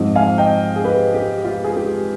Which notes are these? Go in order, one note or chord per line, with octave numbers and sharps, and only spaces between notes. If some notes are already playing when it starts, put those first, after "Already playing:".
Already playing: G#2 F3 C4 D#4
F5 G#5
D#5 G5
G#4
G4 B4
G4
F4
G#4
G4